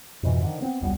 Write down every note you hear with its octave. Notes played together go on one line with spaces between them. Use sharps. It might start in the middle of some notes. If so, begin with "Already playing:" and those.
F2 G#2 B2 E3
D3 D#3 F3
B3 C4
E1 C#2 G3 B3